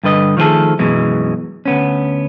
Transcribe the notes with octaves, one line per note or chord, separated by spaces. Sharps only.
G2 D3 B4 D#5
D#3 F3 A3 B3 G#4 A4
F#2 B2 E3 G#3
D2 B3 C#4